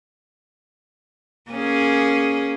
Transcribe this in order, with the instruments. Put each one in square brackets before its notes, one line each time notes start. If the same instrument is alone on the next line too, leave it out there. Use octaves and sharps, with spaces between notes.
[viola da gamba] A#3 C#4 G#4